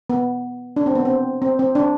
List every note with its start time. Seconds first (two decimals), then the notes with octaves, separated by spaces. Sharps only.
0.10 B3
0.76 D4
0.86 C4
0.95 B3
1.05 C4
1.42 C4
1.59 C4
1.75 D4